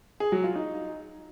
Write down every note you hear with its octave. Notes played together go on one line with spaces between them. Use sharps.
G#4
F#3
F4
D#4